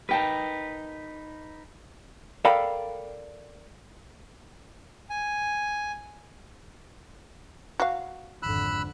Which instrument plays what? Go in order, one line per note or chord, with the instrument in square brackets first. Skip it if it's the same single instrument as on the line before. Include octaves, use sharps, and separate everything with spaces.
[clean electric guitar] D#4 B4 [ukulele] A#4 G5 A5
[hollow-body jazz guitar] A4 A#4 D5 F5 G5 B5
[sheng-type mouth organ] G#5
[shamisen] F#4 F5
[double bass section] G#1 F2 D3 [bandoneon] B5 E6 F#6